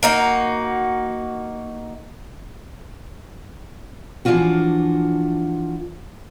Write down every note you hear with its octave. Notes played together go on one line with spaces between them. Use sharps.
A#3 D#4 F#4
E3 F3 G#3 D4 F4 F#4